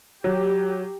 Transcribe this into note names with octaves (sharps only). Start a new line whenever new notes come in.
F#3 G4